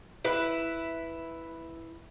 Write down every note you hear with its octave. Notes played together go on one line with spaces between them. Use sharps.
E4 B4